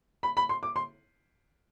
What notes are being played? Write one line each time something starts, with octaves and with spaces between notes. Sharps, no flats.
B5
B5
C6
D6
C6